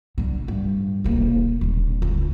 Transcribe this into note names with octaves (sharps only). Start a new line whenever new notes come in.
A2 D3
G2
E1 A#3
D#1 D3
C#2